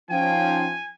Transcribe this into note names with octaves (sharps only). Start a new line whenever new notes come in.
F3 C#4 D#4 F5 G5 G#5